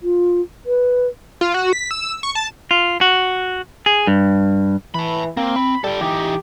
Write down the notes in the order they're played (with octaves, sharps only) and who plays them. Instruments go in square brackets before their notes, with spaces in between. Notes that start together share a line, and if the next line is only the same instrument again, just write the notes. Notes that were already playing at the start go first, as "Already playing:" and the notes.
[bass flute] F4
B4
[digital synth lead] F4
F#4
B6
E6
C#6
A5
[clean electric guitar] F4
F#4
G#4
G2
[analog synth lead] E3 [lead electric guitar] A5 B5
[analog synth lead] A#3 [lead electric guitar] C4
[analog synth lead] B5
[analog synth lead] G3 [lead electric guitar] A4 G5
[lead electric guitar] E3 D#4 [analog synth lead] G4